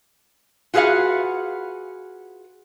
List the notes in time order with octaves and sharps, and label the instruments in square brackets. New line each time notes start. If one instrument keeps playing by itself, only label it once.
[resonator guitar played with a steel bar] F4 F#4 G#4 B4 F5 F#5